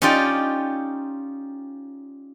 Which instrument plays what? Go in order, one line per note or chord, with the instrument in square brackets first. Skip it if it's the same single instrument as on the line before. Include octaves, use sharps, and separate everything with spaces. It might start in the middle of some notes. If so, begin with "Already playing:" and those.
[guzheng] C#4 D#4 F4 G4 D5